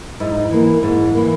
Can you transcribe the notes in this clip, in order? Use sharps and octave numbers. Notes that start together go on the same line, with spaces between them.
G#2 E4
D#4
E4
E3 A#3
G#2
E3 A#3